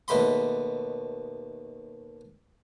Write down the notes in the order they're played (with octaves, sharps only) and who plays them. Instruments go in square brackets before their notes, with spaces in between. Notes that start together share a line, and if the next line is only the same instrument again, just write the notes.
[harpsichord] D#2 B2 A3 B5 C6